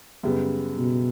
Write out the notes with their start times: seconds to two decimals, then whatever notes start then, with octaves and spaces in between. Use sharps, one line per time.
0.23 F#2 C#3 G3 B3
0.78 B2